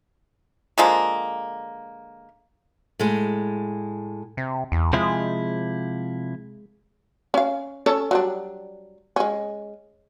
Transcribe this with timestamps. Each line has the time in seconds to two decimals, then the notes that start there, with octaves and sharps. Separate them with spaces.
0.78 D3 F3 G#3 A#3
2.99 A2 G#3
4.37 C3
4.72 E2
4.93 C3 F3 G#3 E4
7.34 C#4 F5
7.86 C#4 A4 C#5
8.11 F#3 G3 D4
9.16 G#3 C#4